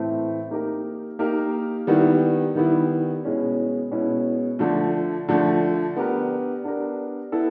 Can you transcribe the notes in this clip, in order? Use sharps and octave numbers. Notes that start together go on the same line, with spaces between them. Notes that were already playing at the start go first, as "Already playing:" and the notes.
Already playing: A2 E3 A3 C4
A#3 D#4 G4 A#4
A#3 D#4 G4 A#4
D#3 G3 B3 E4
D#3 G3 B3 E4
B2 G#3 C#4 E4
B2 G#3 C#4 E4
D3 F3 A3
D3 F3 A3
B3 D4 G4 A#4
B3 D4 G4 A#4
B3 E4 A4